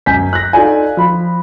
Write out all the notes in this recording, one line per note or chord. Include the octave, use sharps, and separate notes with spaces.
F#2 G#5 G6 B6
F#6 A#6
D#4 F4 A4 D5 G#5
F3 B5